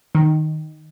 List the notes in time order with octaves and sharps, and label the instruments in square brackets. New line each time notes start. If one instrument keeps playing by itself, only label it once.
[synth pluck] D#3